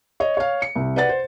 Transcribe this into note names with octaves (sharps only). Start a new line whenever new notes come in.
C#5 D#5
C#5 F5
C#7
C2
B4 D5 F#5 A6
C5